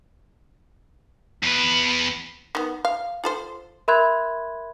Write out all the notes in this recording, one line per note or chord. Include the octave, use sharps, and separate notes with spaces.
E2 B4
D#3 B3
F5
F4 A4 C5
A#4 E5 B5 C6 F#6 G#6